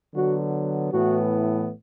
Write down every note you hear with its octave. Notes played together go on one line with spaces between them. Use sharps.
D3 F#3 B3 F#4
A2 E3 B3 F#4